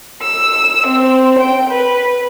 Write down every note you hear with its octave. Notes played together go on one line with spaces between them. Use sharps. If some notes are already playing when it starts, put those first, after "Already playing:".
E6
C4
G5
B4